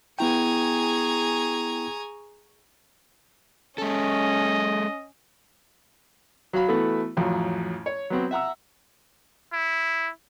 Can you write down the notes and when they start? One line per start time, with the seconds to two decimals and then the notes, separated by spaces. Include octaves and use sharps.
0.19 B3 E4 G#4 G5 G#5 A#5 C#6
3.78 G#3 C#4 A4 D#5
6.53 F#3 F#4 F5 B5
6.68 E3 A3 B3 F#4 A4 B4
7.17 A1 F2 F#3
7.86 C#5
8.10 F#3 B3 C4 F#4
8.31 E5 F#5 A#5 E6
9.53 E4